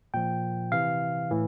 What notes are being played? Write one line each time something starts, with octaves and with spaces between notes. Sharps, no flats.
A#2 F3 G5
C3 E3 F5
A2 E3